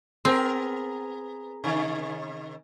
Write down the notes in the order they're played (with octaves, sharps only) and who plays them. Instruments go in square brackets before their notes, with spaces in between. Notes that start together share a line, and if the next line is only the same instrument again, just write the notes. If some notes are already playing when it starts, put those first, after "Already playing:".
[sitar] B3 G#4 A#4 [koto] C4
[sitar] C3 D#3